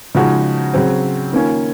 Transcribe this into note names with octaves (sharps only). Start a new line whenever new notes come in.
C#3 F3 G#3 D#4 F#4
C#3 F#3 C4
D#3 A#3 C#4 F4